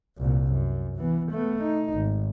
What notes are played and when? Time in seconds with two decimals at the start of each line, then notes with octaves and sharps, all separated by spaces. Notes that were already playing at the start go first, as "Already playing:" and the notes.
0.18 C2 A#2
0.52 F#2
0.97 E3 B3
1.32 A3 B3
1.62 D#4
1.93 G#1